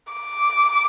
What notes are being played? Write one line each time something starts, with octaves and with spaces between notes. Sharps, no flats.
D6